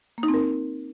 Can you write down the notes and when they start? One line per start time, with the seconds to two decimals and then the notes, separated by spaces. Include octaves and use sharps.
0.18 A#3
0.23 D#4
0.28 C4
0.34 A#4